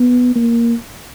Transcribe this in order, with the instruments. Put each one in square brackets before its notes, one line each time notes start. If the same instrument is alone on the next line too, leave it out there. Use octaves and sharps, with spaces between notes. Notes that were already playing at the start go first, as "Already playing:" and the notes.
Already playing: [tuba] B3
A#3